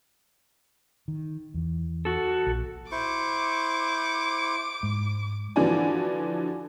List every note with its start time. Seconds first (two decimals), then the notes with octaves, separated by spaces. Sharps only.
1.08 D#3
1.54 E2 E3
2.05 F#4 A4
2.47 A#1
2.92 E4 C5 C#6 D6
4.83 G#2
5.56 D3 E3 F3 F#4 D5 G#5